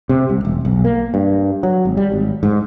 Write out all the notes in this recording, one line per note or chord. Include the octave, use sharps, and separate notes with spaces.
C3
C2
E1
B1
A#3
G2
F#3
G#1
G3
G#1
G#2